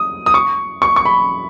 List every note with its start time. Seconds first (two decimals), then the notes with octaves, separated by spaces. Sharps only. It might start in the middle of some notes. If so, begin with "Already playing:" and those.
Already playing: D#6
0.26 D#6
0.34 C#6
0.82 C#6
0.96 C#6
1.05 B5